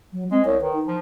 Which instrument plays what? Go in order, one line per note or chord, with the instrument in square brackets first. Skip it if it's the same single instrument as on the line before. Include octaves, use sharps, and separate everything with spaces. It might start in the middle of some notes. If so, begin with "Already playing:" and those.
[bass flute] F#3
[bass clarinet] G#3 [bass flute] C4
[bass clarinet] C2 [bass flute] C#5
[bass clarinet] D#3 [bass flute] B4
[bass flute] D#4
[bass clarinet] F3